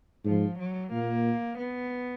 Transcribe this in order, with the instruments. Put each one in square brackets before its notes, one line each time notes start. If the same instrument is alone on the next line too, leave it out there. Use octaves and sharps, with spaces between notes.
[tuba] G#2 [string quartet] F3
[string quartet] F#3
[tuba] A#2 [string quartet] A#3
[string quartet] B3